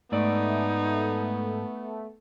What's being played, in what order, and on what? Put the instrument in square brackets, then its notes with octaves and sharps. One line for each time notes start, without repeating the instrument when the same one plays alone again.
[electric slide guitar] G#2 D5 [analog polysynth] A3 [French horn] B3 [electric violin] D#4